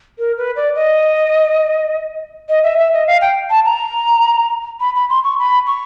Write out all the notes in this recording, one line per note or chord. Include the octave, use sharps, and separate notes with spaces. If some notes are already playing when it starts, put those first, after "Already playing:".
A#4
B4
D5
D#5
D#5
E5
E5
D#5
F5
G5
A5
A#5
B5
B5
C6
C#6
B5
C#6